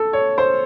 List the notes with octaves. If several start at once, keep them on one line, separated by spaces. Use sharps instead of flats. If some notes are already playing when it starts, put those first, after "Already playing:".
Already playing: A4
C#5
C5